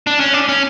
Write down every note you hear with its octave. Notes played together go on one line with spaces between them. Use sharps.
D4
C#4
D4
C#4